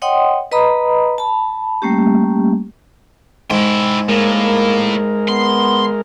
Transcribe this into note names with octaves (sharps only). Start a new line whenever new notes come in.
C#5 D#5 F#5 G5 C6 D#6
B4 D#5 A#5 B5 D#6
A5 B5
G3 A3 A#3 C#4 G4
G#2 E4 G5
A2 G#3 A#3 A#4
B3 C6